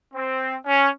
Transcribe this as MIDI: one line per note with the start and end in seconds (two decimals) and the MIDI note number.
0.14 0.56 60
0.66 0.89 61